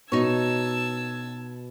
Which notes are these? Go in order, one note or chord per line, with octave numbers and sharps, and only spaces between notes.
B2 D#4 C#5 A5 E6 G#6